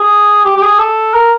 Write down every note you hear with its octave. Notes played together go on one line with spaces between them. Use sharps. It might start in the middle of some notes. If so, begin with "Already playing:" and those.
Already playing: G#4
G4
G4
G#4
A4
A#4